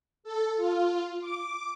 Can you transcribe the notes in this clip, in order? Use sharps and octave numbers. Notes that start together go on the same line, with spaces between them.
A4
F4
D6